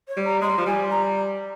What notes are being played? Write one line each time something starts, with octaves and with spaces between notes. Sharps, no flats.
C#5
G3
A#5
G#3 C6
G3
F3
G3 G#5
A#5